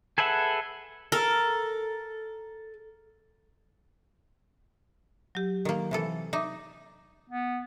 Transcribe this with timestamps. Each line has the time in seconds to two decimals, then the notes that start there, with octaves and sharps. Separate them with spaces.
0.18 G#4 A4 B4 E5 F#5
1.12 A4 A#4
5.35 F#3 G4
5.65 D#3 A#3
5.91 C3 E3 A4
6.33 D#4 E5 D6
7.30 B3